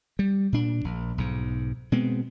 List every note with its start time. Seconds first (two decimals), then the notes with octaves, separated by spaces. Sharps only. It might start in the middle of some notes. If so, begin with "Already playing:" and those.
0.19 G3
0.52 A#2 D4
0.84 A#1
1.18 B1 G#2
1.92 B2 G#3 B3 C4